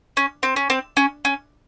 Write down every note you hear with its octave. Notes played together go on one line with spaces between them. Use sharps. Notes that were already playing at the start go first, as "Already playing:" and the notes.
C#4
C4
C#4
C4
C#4
C#4